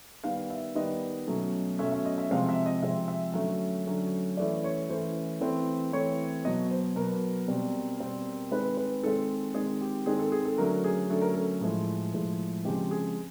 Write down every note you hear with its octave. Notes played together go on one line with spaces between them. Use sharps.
D#3 G3 B3 F5
E5
D#3 G3 B3 D#5
B2 F#3 A3 C#4
B2 F#3 A3 C#4 E5
E5
D#5
E5
C3 F3 G#3 C4 F5
E5
D#5
C3 F3 G#3 C4 E5
E5
D3 F#3 A3 C#4 E5
D3 F#3 A3 C#4
E3 A3 C#4 D5
C#5
E3 A3 C#4 C5
E3 A3 C4
E3 A3 C4 C#5
B2 F#3 B3 D#5
C5
B2 F#3 B3 A#4
B2 G3 C4
B2 G3 C4
D#3 G#3 C4 B4
B4
D#3 G#3 C4 A4
D#3 G#3 C4 G#4
G4
D#3 G#3 C4 G#4
A4
G#4
A4
D3 F#3 A3 C#4 A#4
G#4
D3 F#3 A3 C#4 A4
A#4
A4
A2 F3 G#3 G#4
A2 F3 G#3
C#3 F3 G#3 C4 G4
G#4